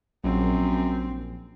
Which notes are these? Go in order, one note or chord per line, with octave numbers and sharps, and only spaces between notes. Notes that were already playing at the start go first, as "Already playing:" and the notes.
A#1 F#2 F#3 C4